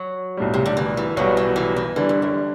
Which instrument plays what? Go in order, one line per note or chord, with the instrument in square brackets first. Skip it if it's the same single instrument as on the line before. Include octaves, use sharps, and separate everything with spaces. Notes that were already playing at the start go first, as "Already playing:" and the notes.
Already playing: [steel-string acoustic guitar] F#3
[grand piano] B1 A2 G3
[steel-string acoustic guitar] C3
D3
E3
E3
[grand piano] B1 B2 G3 B3 F#4 [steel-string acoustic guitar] F#3
[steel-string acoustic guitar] E3
E3
E3
[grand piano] D3 G3 D4 [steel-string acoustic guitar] E3
[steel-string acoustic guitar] G2
F#2